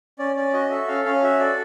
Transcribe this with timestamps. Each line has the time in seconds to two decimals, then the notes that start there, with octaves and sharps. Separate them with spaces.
0.19 C#4 D5
0.36 C#4 D5
0.53 F#4 D#5
0.70 A4 E5
0.88 C#4 F5
1.05 C#4 F5
1.23 F#4 E5
1.39 A4 D5